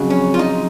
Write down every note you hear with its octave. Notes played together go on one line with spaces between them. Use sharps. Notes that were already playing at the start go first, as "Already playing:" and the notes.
Already playing: F2 C#3 F#3
C#4
F4
D#4